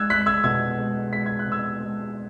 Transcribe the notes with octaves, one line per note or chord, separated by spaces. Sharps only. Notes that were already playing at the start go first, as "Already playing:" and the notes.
Already playing: G#3 E6 F#6 G#6
G#3 F#6 B6
E6 G#6
B2 E6 G#6
G#3
G#3 B6
G#6
F#6
B2
E6 G#6
G#3